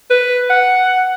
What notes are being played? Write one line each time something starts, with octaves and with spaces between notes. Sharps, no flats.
B4
F#5